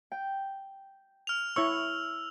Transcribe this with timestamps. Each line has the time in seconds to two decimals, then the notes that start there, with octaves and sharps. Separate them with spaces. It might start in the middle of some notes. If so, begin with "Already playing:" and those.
0.12 G5
1.27 F6 F7
1.56 E4 C#5 C#6 E6